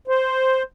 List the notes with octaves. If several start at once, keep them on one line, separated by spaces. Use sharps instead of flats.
C5